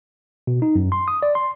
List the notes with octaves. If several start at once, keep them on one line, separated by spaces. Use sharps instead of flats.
B2
D#4
F#2
C6
D#6
D5
C6